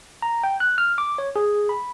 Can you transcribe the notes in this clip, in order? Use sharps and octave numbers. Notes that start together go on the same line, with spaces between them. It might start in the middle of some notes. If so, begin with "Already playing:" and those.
A#5
G5
F#6
F6
D6
C#5
G#4
B5